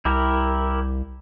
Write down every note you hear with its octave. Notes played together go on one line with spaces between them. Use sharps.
C2 E4 G4 A#4